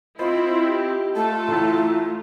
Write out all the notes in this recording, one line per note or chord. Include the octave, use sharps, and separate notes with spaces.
C4 E4 F4 C5 D#5 B5
G4
A3 F4 A4 A5
A1 A2